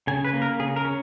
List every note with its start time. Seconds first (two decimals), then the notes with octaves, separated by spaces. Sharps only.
0.07 C#3 G#5
0.25 B4
0.33 A#3
0.42 A#4
0.59 C#3 G#4
0.76 A#4
0.85 C#4